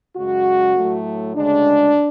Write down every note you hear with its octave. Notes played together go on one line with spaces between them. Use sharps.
F#2 C#3 G#3 F#4
A2 F#3 A3
D2 C#3 G#3 D4